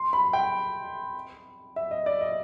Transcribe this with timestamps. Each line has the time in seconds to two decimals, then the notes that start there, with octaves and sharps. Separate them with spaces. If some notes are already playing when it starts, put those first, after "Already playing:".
Already playing: C6
0.13 B5
0.33 G5
1.76 E5
1.91 D#5
2.06 D5
2.21 D#5